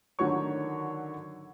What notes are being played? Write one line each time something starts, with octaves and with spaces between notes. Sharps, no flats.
D3 D#3 F#3 F#4 C#5 C#6